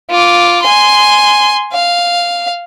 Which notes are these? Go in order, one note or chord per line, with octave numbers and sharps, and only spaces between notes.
F4 D6
G#5 C6
F5